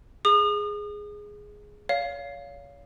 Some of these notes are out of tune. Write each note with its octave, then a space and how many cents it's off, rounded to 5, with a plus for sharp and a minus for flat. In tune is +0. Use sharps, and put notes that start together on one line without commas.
G#4 +0 D#6 -35
C#5 +35 F5 +0